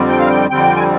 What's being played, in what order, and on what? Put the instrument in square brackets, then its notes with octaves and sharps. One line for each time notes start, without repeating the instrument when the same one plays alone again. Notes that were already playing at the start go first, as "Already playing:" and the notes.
Already playing: [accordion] F2 D3 G3 C4
G5
F5
G5
F2 D3 G3 C4 G5
G#5